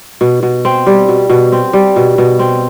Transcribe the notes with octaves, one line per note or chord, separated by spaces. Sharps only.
B2
B2
C4
G3
B2
B2
C4
G3
B2
B2
C4